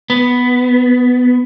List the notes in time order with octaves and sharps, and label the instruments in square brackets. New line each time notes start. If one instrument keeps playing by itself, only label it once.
[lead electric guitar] B3